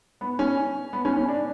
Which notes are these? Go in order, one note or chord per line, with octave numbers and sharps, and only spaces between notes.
B3
C#4
B3
C#4
C#4
D4